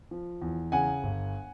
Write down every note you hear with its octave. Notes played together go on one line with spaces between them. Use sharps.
F3
E2
C#3 F#5 G#5
G1